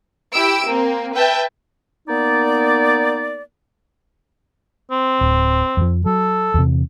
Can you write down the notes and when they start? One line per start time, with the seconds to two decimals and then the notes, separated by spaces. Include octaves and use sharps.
0.34 E4 G4 E6 D7
0.68 A#3 C4
1.14 B4 E5 G5 A5
2.09 A#3 B3 D#4 D5
4.91 C4
5.21 D1
5.77 F2 F3
6.06 F#3 A4
6.54 E2 C3